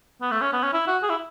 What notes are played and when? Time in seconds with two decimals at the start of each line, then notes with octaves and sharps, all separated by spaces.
0.21 B3
0.31 A3
0.41 C#4
0.53 B3
0.63 C#4
0.73 E4
0.87 F#4
1.03 G#4
1.09 E4